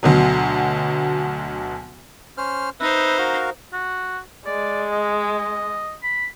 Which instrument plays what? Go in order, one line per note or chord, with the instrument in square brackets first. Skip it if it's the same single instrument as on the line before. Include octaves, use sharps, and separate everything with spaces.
[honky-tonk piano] D2 B2 F#3
[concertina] C#4 C5 F6
[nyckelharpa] D#4 C5 [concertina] B4 E5
[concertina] F#4 A#4 F5
[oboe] F#4
[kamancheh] G#3 [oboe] D5
[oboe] D#5
B5